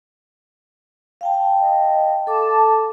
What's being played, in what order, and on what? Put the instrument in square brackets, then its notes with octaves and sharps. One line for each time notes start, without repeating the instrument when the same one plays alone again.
[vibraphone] F5 G5 A5
[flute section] D#5
[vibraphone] A4 D6 [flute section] A5